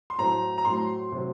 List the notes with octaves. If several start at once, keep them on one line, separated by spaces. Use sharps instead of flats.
C6
A2 F#3 A3 C4 A#5
A#5
A2 F#3 A3 C4 C6
C3 F#3 C4